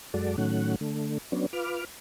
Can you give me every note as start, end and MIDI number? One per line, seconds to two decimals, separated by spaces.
0.14 0.36 42
0.14 0.36 56
0.14 0.36 66
0.14 0.36 69
0.14 0.36 74
0.38 0.75 45
0.38 0.75 51
0.38 0.75 54
0.38 0.75 57
0.38 0.75 61
0.38 0.75 78
0.81 1.18 50
0.81 1.18 57
1.32 1.46 54
1.32 1.46 59
1.32 1.46 61
1.32 1.46 62
1.53 1.85 65
1.53 1.85 71
1.53 1.85 86
1.53 1.85 89